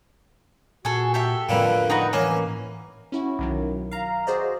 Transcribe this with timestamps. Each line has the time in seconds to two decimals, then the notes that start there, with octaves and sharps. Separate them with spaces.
0.85 A#2 F#4 G#4 A4
1.14 G4 A4 E5
1.49 F2 A2 D3 A#3 B4
1.90 D#4 F#4 B4
2.13 E3 A#3 C#4
3.12 C#4 E4 F#4
3.39 B1 D#3 F#3
3.91 F5 A#5
4.27 F#4 G#4 C5 D5 D#5